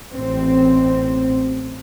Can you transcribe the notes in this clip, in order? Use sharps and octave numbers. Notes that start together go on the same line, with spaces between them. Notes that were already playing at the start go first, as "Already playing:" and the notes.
A1 C4